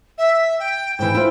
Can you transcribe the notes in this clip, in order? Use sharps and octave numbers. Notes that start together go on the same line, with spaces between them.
E5
G5
G#2 E3 G5
E4 F4 C5